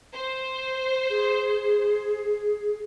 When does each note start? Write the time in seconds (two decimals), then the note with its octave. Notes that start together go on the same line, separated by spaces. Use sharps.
0.13 C5
1.10 G#4